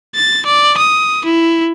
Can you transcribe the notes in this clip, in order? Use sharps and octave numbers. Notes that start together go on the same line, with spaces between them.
A6
D5
D#6
E4